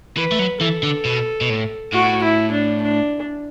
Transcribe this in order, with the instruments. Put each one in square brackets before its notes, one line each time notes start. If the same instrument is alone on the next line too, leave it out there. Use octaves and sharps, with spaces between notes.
[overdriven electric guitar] E3 [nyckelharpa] B4
[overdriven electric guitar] A3
F#3
[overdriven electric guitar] E3 [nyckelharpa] A4
[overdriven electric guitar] D3
B2
B2
A2
[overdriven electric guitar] A2 [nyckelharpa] F#4
[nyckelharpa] E4
D4
D4